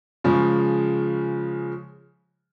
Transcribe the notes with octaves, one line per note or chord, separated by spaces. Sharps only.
C#3 F3 G#3